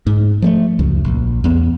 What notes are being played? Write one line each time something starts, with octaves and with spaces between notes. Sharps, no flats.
G#2
F3 G#3 A3
C#2 F#2
A#1
E2 B3